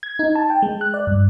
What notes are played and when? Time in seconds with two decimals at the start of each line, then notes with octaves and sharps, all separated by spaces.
0.03 G#6
0.19 D#4
0.35 A5
0.50 G5
0.62 G#3
0.81 F#6
0.94 D5
1.07 G2